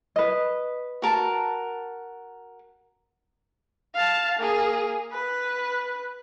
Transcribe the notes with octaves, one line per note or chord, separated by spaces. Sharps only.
B4 D#5
F#4 A#4 A5
F5 A5
A#3 G#4
B4 F#6